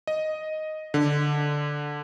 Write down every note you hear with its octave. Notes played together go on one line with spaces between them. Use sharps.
D#5
D3